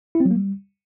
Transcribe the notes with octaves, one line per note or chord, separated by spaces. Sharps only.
E4
C4
F#3
A#3
G3